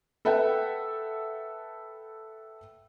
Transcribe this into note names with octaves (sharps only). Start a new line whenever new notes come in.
A4 B4 E5 F#5 G5